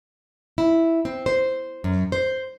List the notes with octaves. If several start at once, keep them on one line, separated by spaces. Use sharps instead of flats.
E4
C4
C5
F#2
C5